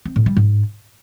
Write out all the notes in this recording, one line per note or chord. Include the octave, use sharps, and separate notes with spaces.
C4
A2
G3
G#2